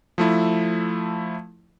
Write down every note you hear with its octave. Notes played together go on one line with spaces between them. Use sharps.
F3 A3 E4